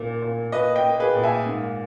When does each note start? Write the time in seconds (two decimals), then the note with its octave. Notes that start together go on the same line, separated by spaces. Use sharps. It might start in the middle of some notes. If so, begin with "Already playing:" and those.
Already playing: A#2 A#3
0.22 A#2
0.52 A#2 B4 D#5
0.76 D#5 G5
0.85 A#3
1.00 G#4 B4
1.15 A#2
1.23 E5 G#5
1.46 G#2